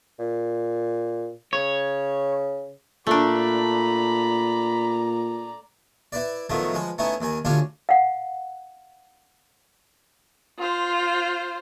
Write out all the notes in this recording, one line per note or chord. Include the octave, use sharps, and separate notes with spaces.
A#2
C#3 C#5
A#2 A3 D4 D5 A#5 B5
E4 B4 D5
A2 D#3 F3 F#3 A3 B3
F3 G#3 B4
A3 B3 C#4 D#4 E4
D#2 D#3 G#5
D2 G3 C#4 D4 F4 G#5
F5 F#5
F4 C5